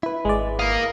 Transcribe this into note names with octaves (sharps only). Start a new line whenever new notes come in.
E4 B4
G#1 G#3 D5
A#4 F5 D#6